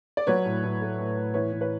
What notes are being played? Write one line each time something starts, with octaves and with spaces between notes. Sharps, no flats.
D5
F#3 B4 C#5
A2
A2
A3
A2
A2
E3 B4 C#5
E3
B4 C#5